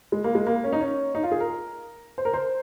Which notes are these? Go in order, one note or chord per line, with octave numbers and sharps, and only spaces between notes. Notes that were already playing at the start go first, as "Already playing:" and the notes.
G#3
A#3
G#3
A#3
C#4
D#4
C#4
D#4
F4
G#4
A#4
C5
A#4
C5